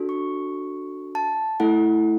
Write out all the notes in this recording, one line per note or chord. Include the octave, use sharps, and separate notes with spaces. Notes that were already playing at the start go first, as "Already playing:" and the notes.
Already playing: D4 F#4 A4
C#6
A5
A3 E4 A4 F#5